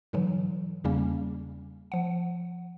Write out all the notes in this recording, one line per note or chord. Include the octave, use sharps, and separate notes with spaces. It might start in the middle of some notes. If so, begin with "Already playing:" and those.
G#2 D3 E3 F#3
E2 C#3 G3 A#3 C#4
F3 F#5